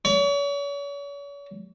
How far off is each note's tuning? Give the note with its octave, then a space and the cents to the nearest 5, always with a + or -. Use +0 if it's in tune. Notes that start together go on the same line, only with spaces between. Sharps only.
C#5 +40